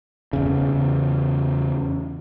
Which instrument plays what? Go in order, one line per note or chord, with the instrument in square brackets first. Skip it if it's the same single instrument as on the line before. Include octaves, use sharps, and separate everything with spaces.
[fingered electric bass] E2 C#3